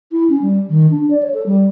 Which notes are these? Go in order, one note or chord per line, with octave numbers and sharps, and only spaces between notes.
E4
C#4
G3
D#3
D4
D5
C#5
A4
G3